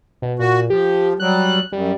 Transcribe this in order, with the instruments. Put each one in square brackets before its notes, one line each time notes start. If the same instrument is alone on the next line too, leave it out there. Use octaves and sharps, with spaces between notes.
[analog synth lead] B2
[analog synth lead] A#2 [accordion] F#4
[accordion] F3 [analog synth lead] G4
[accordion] F#3 G3 [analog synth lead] F#6
[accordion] F#2 [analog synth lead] G3